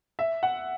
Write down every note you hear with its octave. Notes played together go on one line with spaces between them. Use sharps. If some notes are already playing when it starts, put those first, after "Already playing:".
E5
F#5